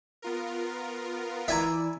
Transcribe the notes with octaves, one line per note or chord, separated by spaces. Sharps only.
B3 F4 A#4
E3 E4 D5 E5 G#5 A#5